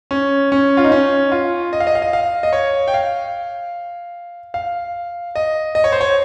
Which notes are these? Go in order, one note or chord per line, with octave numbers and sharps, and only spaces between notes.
C#4
C#4
F4
D#4
C#4
F4
D#5
F5
D#5
F5
D#5
F5
D#5
C#5
G5
F5
F5
D#5
D#5
C#5
C5
C#5